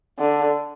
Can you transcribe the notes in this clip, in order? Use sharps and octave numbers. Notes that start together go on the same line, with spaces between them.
D3